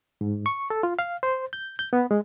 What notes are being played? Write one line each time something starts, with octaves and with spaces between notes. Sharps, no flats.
G#2
C#6
A4
F4
F5
C5
G6
G6
B3
G#3